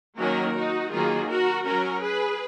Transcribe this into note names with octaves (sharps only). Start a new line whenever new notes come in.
D#3 F#3 A#3 C#4 F#4 A#4
D#4 F#4
D#3 F#3 A#3 F4 G#4
F#4 A#4
F#3 C#4 F#4 A#4
G#4 B4